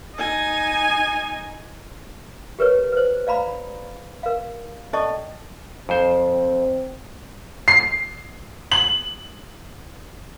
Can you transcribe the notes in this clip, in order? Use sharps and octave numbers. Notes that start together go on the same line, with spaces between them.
D#4 G#5
G4 A#4 B4 C#5
B4 C5
D5 F5 A#5 B5
A#4 F5
C#4 A4 D5 D#5 A5 C#6
F2 C4 C5
C7
F#7